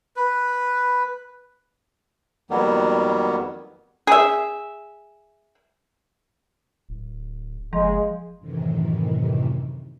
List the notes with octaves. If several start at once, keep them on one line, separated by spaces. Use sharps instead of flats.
B4
F2 D#3 F#3 G3 A#3 B3
G#4 E5
D1
F#1 F3 G#3
F#2 A2 C3 D#3 E3